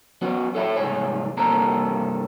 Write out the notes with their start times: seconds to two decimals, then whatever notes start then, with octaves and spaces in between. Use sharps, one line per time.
0.22 F#3 B3 C#4
0.55 A4 C#5 E5 G#5 B5
0.76 C2 G#2 G#4 C#5
1.37 G2 C3 A#3 C4 A4 A#5